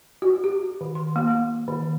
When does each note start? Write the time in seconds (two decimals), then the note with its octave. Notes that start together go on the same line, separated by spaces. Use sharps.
0.22 F#4
0.44 G4
0.81 D#3
0.95 C6
1.16 A#3
1.68 D#3